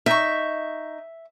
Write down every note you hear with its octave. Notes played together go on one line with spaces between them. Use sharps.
D#4 E5 C#6